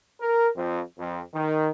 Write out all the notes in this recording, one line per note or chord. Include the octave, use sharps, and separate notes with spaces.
A#4
F2
F2
D#3